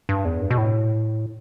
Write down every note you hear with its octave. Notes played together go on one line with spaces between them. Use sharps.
G2
E2
G2
B2
A2